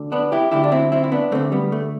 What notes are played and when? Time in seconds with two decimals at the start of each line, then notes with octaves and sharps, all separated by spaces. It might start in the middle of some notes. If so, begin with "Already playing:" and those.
Already playing: D2 D3
0.12 B3 D4
0.32 E4 G4
0.51 D2 D3 E4 G4
0.64 D4
0.72 C4 E4
0.92 C4 E4
1.04 E4
1.12 B3 D4
1.31 D2 D3 A3 C4
1.52 G3 B3
1.72 A3